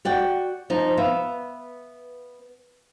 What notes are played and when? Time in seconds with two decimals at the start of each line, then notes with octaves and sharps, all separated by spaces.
0.05 F#4 D5 F#5 G5
0.70 F3 D#4
0.97 B3 E5 F5